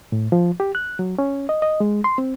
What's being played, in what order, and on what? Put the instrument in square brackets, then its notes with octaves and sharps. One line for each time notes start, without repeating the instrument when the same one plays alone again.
[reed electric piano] A2
F3
G4
F#6
F#3
C#4
D#5
D#5
G#3
C6
C4